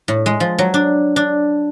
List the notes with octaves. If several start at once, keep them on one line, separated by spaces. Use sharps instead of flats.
A2
G#3
F3
F#3
D4
D4